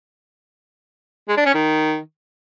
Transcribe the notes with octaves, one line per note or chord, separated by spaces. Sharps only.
G#3
D4
C#4
D#3